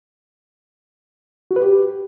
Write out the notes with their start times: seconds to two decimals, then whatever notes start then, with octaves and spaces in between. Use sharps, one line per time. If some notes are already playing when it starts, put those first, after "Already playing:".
1.51 F#4
1.56 B4
1.62 G4